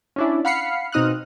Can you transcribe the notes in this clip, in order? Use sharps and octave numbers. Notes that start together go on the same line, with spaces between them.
C#4 D4 E4
F5 F#5 B5 F6 C7 C#7
B2 C4 D#4 D#6 F6 F#6